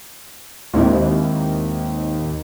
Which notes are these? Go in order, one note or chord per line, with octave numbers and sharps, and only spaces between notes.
D#2 G#2 C4 E4